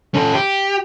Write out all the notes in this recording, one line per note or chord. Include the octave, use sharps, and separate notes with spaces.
C#4 A4
G4